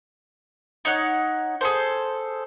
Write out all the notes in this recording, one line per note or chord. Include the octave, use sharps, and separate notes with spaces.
D#4 C#5 F#5
G#4 A4 C5